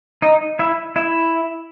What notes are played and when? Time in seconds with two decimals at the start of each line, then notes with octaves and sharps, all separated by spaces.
0.22 D#4 D#5
0.59 E4 E5
0.96 E4 E5